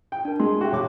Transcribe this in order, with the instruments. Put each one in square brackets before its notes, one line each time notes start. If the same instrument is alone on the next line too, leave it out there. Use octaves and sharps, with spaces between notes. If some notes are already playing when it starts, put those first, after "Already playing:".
[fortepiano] G5
[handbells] D4 A#4
[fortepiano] G#3 [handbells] C6
[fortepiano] F#4 G4 E5
[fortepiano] A#1 [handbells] C#5 D6